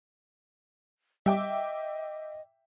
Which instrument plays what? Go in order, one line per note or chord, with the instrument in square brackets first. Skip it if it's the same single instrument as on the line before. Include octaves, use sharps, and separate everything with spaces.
[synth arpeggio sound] G3 [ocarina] D#5 [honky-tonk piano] E5 G5 D6